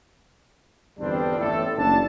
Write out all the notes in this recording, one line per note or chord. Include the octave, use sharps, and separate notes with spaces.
G1 E2 G2 G3 C4 D4
A1 A2 A4
F#1 D4 A5